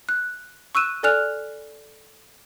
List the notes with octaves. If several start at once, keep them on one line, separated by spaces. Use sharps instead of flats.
F#6
C#6 E6 F#6 D#7 E7
A4 D5 G#5 F6 F#6 F7